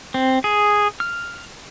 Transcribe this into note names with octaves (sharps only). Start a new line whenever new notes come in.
C4
G#4
F6